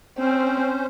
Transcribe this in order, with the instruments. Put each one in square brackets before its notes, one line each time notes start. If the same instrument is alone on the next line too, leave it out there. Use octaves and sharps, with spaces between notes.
[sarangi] C4 [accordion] C#4 C5